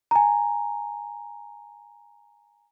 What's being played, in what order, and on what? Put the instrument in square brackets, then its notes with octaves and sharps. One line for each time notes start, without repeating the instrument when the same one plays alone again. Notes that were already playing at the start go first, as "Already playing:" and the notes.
[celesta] G#5 A#5